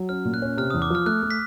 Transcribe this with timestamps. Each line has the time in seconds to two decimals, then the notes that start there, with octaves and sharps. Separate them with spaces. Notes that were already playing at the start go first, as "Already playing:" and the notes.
Already playing: F#3
0.09 C#4 F6
0.25 A#2
0.34 F#6
0.42 C#4
0.57 C3 F6
0.70 D#6
0.74 E2
0.82 D6
0.90 F3 F6
1.06 A3 F#6
1.23 A3
1.31 B6